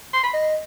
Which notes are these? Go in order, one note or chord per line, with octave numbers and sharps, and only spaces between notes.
C6
B5
D#5